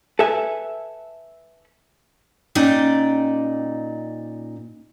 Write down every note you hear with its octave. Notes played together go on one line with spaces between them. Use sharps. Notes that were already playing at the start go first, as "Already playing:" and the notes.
A4 B4 E5 G#5
A#2 C#4 D#4 D5 G5